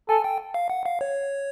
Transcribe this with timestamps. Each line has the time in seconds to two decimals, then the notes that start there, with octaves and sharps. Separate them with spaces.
0.09 A4 G#5
0.24 G5
0.54 F5
0.70 F#5
0.86 F5
1.01 C#5